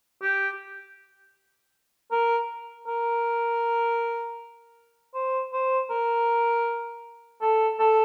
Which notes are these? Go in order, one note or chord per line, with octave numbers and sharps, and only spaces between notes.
G4
A#4
A#4
C5
C5
A#4
A4
A4